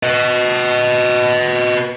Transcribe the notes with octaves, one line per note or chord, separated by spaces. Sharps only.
B4 D#5